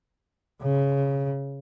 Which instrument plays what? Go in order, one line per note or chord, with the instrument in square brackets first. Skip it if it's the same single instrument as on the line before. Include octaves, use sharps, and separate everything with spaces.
[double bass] C#3